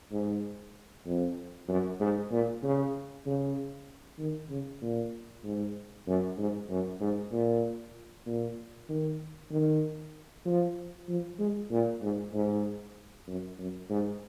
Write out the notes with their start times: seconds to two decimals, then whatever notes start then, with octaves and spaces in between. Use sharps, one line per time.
0.12 G#2
1.06 F2
1.68 F#2
2.00 G#2
2.31 A#2
2.63 C#3
3.26 C#3
4.19 D#3
4.50 C#3
4.82 A#2
5.44 G#2
6.07 F#2
6.38 G#2
6.70 F#2
7.01 G#2
7.32 A#2
8.26 A#2
8.89 D#3
9.51 D#3
10.45 F3
11.08 F3
11.39 G#3
11.71 A#2
12.02 G#2
12.34 G#2
13.28 F#2
13.59 F#2
13.90 G#2